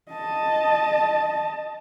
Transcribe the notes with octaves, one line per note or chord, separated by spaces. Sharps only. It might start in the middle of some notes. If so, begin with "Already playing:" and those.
D#5 A5